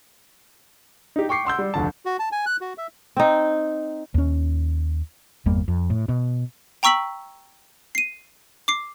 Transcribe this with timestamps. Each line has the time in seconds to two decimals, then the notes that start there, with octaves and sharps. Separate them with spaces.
1.16 D#4 G4
1.29 G5 C#6 D6 C7 C#7
1.45 F#5 C6 E6 G6
1.59 G3
1.74 F1 D2 A5
2.06 F#4
2.19 A5
2.32 G#5
2.46 F#6
2.61 F#4
2.78 E5
3.17 C4 D#4
4.14 D#2 C#4
5.46 G1 E2 G3 A#3
5.68 F2
5.90 A2
6.09 B2
6.83 G5 A#5 C#6 E6 B6 F#7
7.95 C7 D#7
8.68 D6 C7